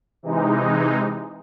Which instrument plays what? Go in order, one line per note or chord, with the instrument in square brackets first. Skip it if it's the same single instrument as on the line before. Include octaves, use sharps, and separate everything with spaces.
[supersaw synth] C3 E3 G#3 D#4